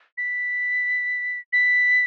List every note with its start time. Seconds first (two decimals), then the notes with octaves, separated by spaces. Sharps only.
0.18 B6
1.53 B6